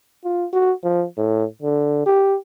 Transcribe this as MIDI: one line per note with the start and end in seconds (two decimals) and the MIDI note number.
0.24 0.46 65
0.53 0.72 66
0.84 1.05 53
1.17 1.44 45
1.62 2.04 50
2.06 2.36 67